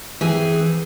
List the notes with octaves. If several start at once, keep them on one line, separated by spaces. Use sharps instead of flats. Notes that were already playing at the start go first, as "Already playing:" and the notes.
E3 C4 G#4